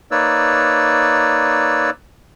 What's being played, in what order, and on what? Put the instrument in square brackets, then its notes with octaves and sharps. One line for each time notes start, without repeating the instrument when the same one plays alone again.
[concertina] A#3 D#4 B4 C#5 D5 E6